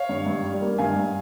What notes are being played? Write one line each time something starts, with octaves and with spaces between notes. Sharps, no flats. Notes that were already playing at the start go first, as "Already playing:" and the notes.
Already playing: C#5 F5
G2
G2
G3
A#3
G2 F5 G#5
G2